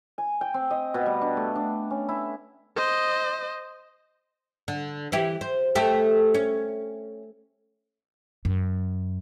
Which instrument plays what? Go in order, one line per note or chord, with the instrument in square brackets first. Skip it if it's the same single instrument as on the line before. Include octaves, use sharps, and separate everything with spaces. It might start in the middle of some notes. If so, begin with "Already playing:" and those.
[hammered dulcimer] G#5
G5
C4
D#5
B2
G3
D4
A3
D4
C#4
E4
[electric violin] C5 D#5
[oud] D3
E3 E4 G4
C5
A3 G4 A4
C#4
[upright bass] F#2